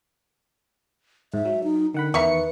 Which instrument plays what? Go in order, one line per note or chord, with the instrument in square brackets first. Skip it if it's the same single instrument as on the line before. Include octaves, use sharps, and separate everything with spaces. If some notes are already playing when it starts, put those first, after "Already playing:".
[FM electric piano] G#2 [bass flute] E5
[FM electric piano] F#3
[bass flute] D#4
[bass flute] D3 [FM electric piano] D#3 F#5 B5
[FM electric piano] E2 D#3 C#7 [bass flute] B4 [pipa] E5 A#5 C#6